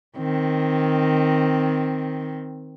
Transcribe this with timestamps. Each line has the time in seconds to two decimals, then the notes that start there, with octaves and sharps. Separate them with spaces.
0.18 D#3 C4